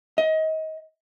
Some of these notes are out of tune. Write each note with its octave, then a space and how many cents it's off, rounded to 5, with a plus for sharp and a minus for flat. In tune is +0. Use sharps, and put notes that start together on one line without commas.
D#5 +25